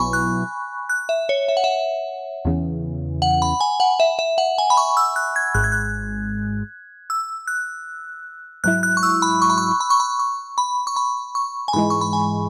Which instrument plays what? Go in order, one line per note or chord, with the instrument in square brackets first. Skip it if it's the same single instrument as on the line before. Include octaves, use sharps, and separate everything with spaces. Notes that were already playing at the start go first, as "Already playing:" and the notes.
Already playing: [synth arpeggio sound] B1 B2 F#3 B3 E4 [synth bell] G#5 B5 C#6
[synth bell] F#6
F#6
E5
C#5
E5
F#5
E5
[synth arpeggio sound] E2 C#3 E3
[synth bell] F#5
B5
G#5
F#5
E5
E5
F#5
G#5
B5
C#6
E6
F#6
G#6
[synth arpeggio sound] G#1 G#2 G#3 [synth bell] F#6
[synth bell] G#6
F#6
E6
F#6
[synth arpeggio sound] G#2 F#3 E4 [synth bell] F#6
[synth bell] F#6
C#6
E6
B5
C#6
B5
C#6
B5
C#6
B5
C#6
B5
C#6
B5
C#6
G#5
[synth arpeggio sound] G#2 E3 G#3 [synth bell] B5
[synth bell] C#6
B5
G#5